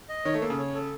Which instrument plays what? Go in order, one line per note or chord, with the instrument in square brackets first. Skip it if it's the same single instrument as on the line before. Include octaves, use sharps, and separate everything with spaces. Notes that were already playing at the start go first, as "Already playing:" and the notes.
[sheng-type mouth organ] D#5
[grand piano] D#3 [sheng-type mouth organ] C#5
[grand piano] A3
[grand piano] A#3 [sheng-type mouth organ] A4
[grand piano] C#3
[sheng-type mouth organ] C#5
A4